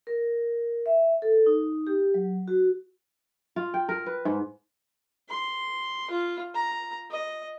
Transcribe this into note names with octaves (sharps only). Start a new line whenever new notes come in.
A#4
E5
A4
D#4
G4
F#3
F#4
F4
G5
A#4
B4
G#2
C6
F4
A#5
D#5